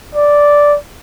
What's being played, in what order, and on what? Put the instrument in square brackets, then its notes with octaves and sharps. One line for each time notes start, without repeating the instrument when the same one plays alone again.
[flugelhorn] D5